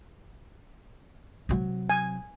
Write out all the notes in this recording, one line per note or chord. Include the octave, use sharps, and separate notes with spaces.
C3 F#3
G#5